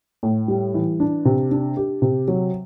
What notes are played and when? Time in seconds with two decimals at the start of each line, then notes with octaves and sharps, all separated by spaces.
0.23 A2
0.48 G3
0.74 E3
1.00 D4
1.25 C3
1.51 D4
1.77 G4
2.02 C3
2.28 F#3